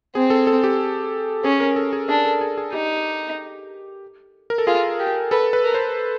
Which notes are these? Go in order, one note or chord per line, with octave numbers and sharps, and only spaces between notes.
C4 G#4
A4
A4
G4
C#4 G#4
A#4
A4
G#4
D4 G#4
A4
G#4
G#4
D#4 G4
A#4
A4
F4 G#4
G4
A4 B4
B4
A#4
C5